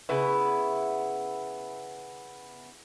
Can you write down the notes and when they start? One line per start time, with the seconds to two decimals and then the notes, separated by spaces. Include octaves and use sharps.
0.09 C#3 B3 E4